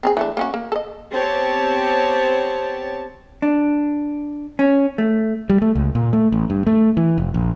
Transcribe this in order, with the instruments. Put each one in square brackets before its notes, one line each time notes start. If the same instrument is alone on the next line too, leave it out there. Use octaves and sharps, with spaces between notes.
[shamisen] C4 D#4 G#4
E3 A3 D4
A#3 C#4 F#4
A#3
A4 D#5
[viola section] B3 C4 G4 C#5 A5
[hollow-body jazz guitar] D4
C#4
A3
[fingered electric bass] G3
A3
C#2
A#2
A3
A1
G2
A3
E3
F1
A#1